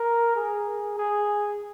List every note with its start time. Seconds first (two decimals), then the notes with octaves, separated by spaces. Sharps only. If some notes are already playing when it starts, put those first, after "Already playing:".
Already playing: A#4
0.36 G#4
0.98 G#4